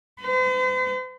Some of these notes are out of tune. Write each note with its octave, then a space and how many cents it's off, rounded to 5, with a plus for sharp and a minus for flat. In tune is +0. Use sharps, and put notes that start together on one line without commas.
C5 -45